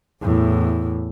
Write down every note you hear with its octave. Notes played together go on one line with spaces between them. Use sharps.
E2 A2